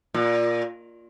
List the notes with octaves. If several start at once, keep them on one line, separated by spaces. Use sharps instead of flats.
A#2